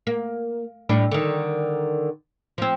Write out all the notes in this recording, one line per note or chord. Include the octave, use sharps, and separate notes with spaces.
A#3
A2 G3 D4
D3 D#3
F3 C4